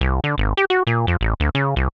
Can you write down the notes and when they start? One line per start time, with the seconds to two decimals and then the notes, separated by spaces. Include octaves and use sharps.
0.01 C2
0.24 D3
0.38 G#1
0.57 G4
0.70 F#4
0.87 A#2
1.07 F2
1.21 A1
1.40 D2
1.55 C#3
1.76 C2